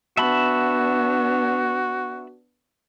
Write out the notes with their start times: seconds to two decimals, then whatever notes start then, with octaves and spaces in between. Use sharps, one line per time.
0.17 B3 D4 F#4 E5 A5 B5